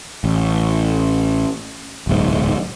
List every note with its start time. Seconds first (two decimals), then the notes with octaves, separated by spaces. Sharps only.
0.24 A1
2.07 D1 B1 G#2